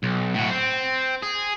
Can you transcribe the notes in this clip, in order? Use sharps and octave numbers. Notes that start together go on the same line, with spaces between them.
B1
A2 F#4
C4
G#4